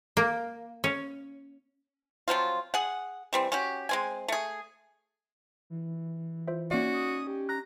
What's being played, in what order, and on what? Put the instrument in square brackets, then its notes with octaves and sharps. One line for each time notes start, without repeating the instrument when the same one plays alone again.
[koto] A#3
C#4
[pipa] F3 F#3 C4 F4
G#4 F#5
E3 G3 C4
C#4 F#4 G4
G#3 C4 G#5
A3 G#4
[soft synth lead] E3
[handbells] F4 C5 E5
[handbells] A#3 E5 [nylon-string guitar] C#4 D#4 D5 [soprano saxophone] F#4
[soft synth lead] D#6
G4
[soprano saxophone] A#5 [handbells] F#6